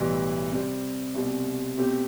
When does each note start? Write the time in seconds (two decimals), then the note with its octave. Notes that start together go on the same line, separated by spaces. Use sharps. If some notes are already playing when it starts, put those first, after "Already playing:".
Already playing: B1 A2 E3 G3
0.51 C3 G3 C4
1.14 C2 B2 G3 C4
1.78 B2 A3 C4 G4